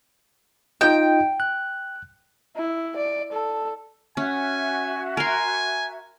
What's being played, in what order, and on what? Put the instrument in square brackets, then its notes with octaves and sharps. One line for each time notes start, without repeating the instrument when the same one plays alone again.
[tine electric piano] D#4 F4 D#5 [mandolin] G5
[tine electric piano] F#6
[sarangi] E4
D5
A4
[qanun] C#4 [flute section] F#4 E5 [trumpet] G#5
[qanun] A#4 C6 [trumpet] G#5